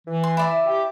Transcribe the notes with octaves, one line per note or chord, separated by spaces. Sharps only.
E3
C6
E4 D5 E5
G4